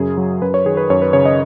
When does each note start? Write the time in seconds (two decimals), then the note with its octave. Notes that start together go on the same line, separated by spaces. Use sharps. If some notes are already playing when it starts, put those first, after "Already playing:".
Already playing: F#2 C#3 G#4
0.18 F#3
0.42 F#2 B4
0.54 C#5
0.65 D#3 G#4
0.77 B4
0.90 F#2 C#5
1.02 B4
1.13 C#3 C#5
1.25 D#5